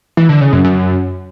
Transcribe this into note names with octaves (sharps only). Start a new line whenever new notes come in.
E3
D3
C#3
F#2
F#2